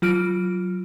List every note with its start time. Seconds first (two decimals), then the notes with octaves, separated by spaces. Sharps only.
0.02 F#3 F4 F6 D7